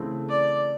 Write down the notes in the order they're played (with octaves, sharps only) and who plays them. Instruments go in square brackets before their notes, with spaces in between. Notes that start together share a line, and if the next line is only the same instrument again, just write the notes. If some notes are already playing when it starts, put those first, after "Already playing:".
Already playing: [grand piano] C#3 E3 A3 C4
[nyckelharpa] D5